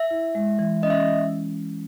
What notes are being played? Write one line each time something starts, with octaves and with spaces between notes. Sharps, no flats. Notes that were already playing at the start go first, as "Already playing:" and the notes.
Already playing: E5
E4
G#3
E3
C#4 D#5
E5